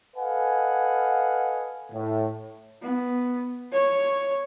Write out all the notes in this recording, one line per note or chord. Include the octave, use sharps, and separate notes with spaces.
A4 B4 D#5 F5 F#5 G#5
A2
B3
C#5